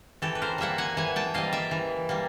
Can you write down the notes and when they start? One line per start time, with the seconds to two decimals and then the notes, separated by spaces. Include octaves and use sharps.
0.22 E3 G4 A4
0.35 B4
0.42 A#4 C5
0.58 G3 A#3 E5 F#5
0.78 F#5 G#5
0.97 E3 F#5 G#5
1.16 G5 A5
1.34 G3 A#3 D#5 F5
1.53 D5 E5
1.71 E3
2.09 G3 A#3